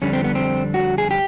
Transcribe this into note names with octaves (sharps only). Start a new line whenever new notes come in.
F2 D3 G3 C#4
C4
B3
C4
F#4
G#4
G4